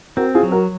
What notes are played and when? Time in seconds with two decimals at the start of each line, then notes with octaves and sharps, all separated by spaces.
0.17 C4 F#4 A#4
0.35 F4 G#4
0.43 F#3
0.52 F#4 A#4